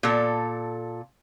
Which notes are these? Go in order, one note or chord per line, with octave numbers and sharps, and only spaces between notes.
A#2 A4